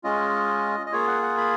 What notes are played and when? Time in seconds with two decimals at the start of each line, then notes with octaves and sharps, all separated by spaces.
0.04 G#3 C#4 F4 D#5
0.87 D#5
0.92 A#3 F4 G#4 C#5
1.08 F#5
1.22 F#5
1.38 B5